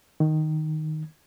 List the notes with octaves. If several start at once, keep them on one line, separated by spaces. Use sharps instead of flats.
D#3